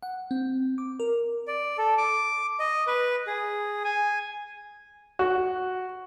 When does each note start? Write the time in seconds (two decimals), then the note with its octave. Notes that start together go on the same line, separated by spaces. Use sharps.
0.03 F#5
0.31 C4
0.78 D6
1.00 A#4
1.48 D5
1.78 A4
1.98 D6
2.60 D#5
2.87 B4
3.27 G#4
3.84 G#5
5.19 F#4